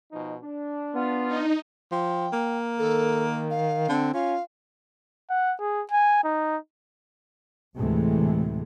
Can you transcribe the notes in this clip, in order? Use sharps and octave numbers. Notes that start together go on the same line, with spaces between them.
B2 F3 D#4
D4
B3 F4
D#4
F3 G5
A#3
D#3 A4
F5
D3 C4
C#4 F4 F5
F#5
G#4
G#5
D#4
D2 A2 C3 E3 G#3 A3